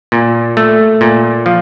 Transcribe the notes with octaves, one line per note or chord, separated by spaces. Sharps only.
A#2
A3
A#2
F3